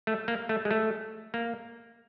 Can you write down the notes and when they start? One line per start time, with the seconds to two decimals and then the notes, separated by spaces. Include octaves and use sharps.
0.07 A3
0.28 A#3
0.49 A3
0.65 G#3
0.71 A3
1.34 A#3